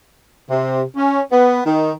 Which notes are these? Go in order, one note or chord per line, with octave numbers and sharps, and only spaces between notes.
C3
C#4
B3
D#3